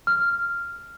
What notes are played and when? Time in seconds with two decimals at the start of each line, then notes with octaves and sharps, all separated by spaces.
0.07 F6